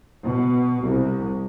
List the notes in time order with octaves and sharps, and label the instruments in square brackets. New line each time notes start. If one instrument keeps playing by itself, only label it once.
[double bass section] B2
C2